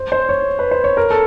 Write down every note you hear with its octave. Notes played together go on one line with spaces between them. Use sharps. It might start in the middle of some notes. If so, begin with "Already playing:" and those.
Already playing: C5
C5
C#5
B4
C5
C#5
A#4
A4